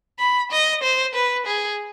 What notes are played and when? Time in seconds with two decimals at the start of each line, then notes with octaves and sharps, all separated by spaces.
0.19 B5
0.51 D#5
0.83 C5
1.14 B4
1.46 G#4